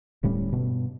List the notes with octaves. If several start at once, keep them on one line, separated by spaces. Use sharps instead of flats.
D1 A2 G3 C#4
G2 B2